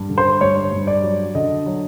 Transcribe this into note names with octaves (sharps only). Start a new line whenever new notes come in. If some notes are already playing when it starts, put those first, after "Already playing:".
Already playing: G2
D3
C5
G2 C#5
G2
D5
F#3
D3 D#5
F#3